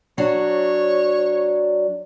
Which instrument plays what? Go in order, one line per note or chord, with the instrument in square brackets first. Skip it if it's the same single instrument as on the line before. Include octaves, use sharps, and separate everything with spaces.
[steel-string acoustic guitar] F#3 D4 [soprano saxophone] C#5